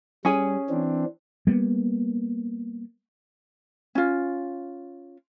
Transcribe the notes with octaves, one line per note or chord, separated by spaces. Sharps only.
G3 C#4 G#4 G#5
E3 C4 D4
G3 A#3 B3
C#4 F4